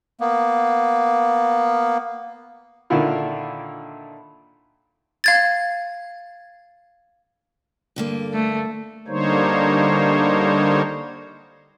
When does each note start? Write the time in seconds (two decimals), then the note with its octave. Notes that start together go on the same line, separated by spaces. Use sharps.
0.20 A#3 B3
2.90 A#2 D3 D#3 D4 E4 F4
5.24 F5 G#6 A6
7.96 G2 D3 A#3
8.34 A3
9.08 D3 G3 A#3 D#4 C5 C#5